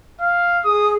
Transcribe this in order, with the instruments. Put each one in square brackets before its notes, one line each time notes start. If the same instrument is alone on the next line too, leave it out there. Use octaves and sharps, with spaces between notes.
[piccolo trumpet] F5
[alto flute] G#4 [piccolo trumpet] D#6